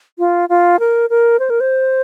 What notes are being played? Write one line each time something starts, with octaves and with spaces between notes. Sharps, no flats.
F4
F4
A#4
A#4
C5
A#4
C5